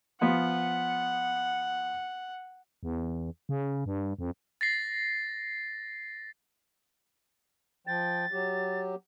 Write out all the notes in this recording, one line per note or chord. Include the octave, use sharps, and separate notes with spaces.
F3 B3 F4 F#5
E2
C#3
G2
F2
A6 A#6 C7
F3 G5 A6
F#3 G4